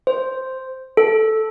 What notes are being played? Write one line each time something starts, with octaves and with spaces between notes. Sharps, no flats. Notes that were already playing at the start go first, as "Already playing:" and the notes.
C5
A4